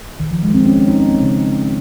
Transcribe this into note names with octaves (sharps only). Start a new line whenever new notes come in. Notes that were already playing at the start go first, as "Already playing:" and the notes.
D#3
F3
G#3
C4
C#4
C#4
D#4
C#4
C4
C#3